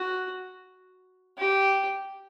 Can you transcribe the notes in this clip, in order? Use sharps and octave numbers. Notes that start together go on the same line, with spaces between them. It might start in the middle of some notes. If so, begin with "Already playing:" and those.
Already playing: F#4
G4